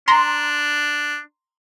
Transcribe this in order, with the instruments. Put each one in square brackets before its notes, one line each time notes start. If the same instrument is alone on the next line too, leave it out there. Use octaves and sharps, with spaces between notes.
[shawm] D4 [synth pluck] A#5 C6